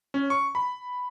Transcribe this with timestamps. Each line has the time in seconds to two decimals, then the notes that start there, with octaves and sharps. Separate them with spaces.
0.14 C#4
0.30 C#6
0.55 B5